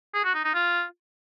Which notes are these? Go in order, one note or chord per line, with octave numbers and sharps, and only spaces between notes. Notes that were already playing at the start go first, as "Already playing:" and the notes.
G#4
F#4
D#4
D#4
F4